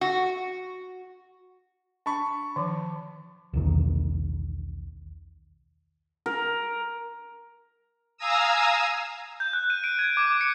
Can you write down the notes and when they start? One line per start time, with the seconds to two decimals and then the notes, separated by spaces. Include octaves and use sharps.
0.01 F#4
2.06 D4 A5 B5 C#6
2.56 D#3 F3
3.53 B1 E2 D#3
6.26 A#4
8.18 F5 G#5 A#5 D#6 E6
9.40 G6
9.53 F#6
9.70 D#7
9.84 D7
9.99 G#6
10.17 D6
10.28 D6
10.41 C#7